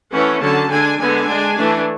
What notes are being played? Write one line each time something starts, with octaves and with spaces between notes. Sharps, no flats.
E3 A3 C#4 F#5
D3 F#3 C#4 A5
D3 G#3 D4 G#5
D3 G#3 B3 G#5
G#3 D4
E3 A3 D4